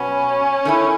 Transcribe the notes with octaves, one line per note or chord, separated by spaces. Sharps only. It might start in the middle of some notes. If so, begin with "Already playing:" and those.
Already playing: B2 F#3 B3 C#4
D#3 A3 E4